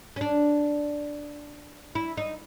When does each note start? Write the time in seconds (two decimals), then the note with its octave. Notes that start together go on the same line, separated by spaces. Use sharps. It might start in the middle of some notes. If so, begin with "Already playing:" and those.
0.16 C#4
0.21 D4
1.95 E4
2.17 D#4